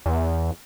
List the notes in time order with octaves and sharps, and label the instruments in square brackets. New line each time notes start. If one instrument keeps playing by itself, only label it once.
[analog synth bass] E2